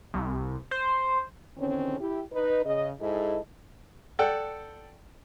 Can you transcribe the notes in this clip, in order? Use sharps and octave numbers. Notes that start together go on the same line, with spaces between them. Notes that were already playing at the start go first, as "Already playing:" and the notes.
C2
C5
E2 D3 D#3 C4 C#4
E4 G4
D#4 B4
C#3 D#5
G#2 E4 G#4 A4 D#5
A4 D5 F#5 G5